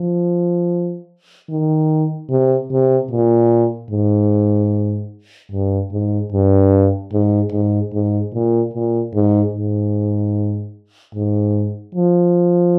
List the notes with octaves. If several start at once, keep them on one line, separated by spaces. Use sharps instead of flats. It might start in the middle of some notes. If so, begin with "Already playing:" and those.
Already playing: F3
D#3
C3
C3
A#2
G#2
G2
G#2
G2
G#2
G#2
G#2
A#2
A#2
G#2
G#2
G#2
F3